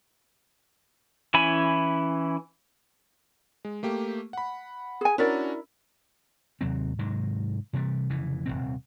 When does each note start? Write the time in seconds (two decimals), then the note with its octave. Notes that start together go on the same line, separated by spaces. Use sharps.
1.34 E3 C#4 E4 G#5 B5
3.65 G#3
3.83 A3 A#3 G4
4.33 F#5 B5
5.01 G#4 G#5
5.18 C#4 D4 E4 F#4 A#4 D5
6.61 D#2 C3 F#3 C4
6.99 G#2 C3 D#3 F#3
7.73 C3 E3 F3 G3
8.09 F1 C#3 E3
8.46 D#1 G#1 C3 C4